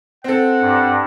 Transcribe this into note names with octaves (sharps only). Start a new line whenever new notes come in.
C4 A4 F#5
G2